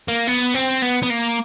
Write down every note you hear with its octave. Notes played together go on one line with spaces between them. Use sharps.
A#3
B3
C4
B3
B3
A#3